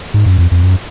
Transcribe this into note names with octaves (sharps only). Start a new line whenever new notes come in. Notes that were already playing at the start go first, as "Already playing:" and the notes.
G#2
F#2
F2
F2
F#2